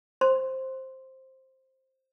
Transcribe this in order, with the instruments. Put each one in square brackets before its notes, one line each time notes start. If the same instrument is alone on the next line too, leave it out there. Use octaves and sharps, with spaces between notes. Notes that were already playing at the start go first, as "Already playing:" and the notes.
[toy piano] C5 C6